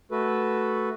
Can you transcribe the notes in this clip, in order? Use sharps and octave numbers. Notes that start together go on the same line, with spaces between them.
A3 F#4 A4 B4